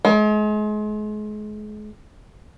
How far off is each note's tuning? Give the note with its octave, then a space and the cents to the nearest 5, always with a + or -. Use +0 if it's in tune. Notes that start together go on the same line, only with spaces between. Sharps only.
G#3 +35